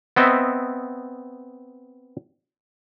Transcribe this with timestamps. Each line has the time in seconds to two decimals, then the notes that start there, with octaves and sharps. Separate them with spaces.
0.16 B3 C4 D#5 E5